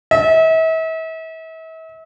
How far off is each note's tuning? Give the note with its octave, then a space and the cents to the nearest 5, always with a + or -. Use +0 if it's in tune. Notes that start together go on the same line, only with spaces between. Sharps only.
E5 -40